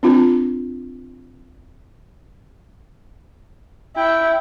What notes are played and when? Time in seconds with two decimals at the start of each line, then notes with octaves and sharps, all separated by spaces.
0.03 C4 D4 F4
3.97 E4 G5